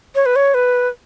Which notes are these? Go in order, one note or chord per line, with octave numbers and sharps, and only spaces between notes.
C#5
B4
C#5
B4